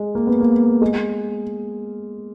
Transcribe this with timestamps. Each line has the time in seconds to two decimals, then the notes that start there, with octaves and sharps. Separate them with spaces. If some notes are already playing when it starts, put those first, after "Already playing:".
Already playing: G#3
0.15 A#3
0.27 B3
0.40 A#3
0.81 G#3